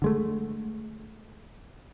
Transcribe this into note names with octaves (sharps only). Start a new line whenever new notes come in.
D3 G#3 A3